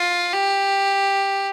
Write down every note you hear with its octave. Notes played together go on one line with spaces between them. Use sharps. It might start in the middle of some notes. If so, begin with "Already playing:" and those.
Already playing: F4
G4